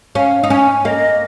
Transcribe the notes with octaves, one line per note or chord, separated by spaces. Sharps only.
C#4 F5
D#4
C#4 G#5
A#3 D#5